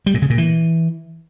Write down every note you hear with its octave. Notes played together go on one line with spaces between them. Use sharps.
G3
A#2
C#3
A#2
E3